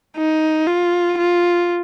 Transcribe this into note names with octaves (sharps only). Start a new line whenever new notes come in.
D#4
F4
F4